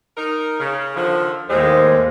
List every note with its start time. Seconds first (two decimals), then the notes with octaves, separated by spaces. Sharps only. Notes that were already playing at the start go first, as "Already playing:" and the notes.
0.17 D#4 A#4
0.59 C#3
0.96 D3 D#3 F3
1.50 D#2 A2 G3 G#3 C5